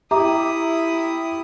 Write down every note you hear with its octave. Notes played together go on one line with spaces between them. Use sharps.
E4 G4 E5 A#5 D6 D#6